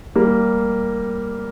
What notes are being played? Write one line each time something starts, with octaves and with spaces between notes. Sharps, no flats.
G3 A#3